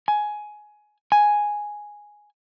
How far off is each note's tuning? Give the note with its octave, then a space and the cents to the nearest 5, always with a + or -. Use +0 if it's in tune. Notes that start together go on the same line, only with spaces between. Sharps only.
G#5 +15
G#5 +0